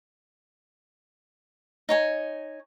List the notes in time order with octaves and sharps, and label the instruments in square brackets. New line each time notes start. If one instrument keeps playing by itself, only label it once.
[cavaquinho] D#4 C#5 G#5